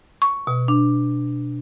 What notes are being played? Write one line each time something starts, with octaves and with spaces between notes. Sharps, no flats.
C#6
B2
D4